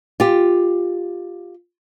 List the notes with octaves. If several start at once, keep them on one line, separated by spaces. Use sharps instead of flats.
F4 G4